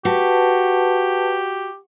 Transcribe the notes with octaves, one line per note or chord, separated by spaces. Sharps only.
F#4 G4 B4 A5